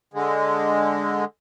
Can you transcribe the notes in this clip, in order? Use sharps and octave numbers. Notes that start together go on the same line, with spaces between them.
D3 G#3